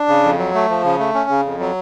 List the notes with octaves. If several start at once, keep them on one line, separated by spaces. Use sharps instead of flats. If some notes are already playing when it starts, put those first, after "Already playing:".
Already playing: D4
C#3
F2
F#3
A3
F3
C#3
A3
C#4
C#3
F2
F#3